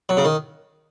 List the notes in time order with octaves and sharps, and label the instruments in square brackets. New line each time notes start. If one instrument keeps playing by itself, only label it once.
[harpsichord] F#3
C#3
D#3